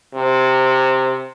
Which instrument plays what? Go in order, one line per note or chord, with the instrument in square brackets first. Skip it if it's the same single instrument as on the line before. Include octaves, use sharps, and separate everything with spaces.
[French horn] C3